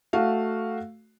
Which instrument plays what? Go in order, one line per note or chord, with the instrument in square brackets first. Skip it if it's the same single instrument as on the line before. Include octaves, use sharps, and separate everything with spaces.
[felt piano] A3 F#4 F5